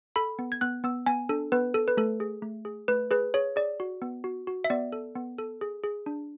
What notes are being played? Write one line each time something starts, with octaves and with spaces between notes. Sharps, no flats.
A4 B5
B3
G#6
B3 F#6
B3 E6
B3 G#5
D4 A4
B3 B4
A4
B4
A3 A4
G#4
A3
G#4
A3 B4
G#4 B4
G#4 C#5
G#4 D5
F#4
B3
F#4
F#4
E5
B3 D5
A4
B3
A4
G#4
G#4
D4